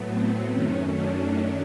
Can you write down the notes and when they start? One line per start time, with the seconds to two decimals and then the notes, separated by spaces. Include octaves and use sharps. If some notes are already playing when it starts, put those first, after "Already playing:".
Already playing: A2 F#3 A3 B3
0.08 C4
0.52 F#2 D#3 F#3 A3 C#4
0.96 D4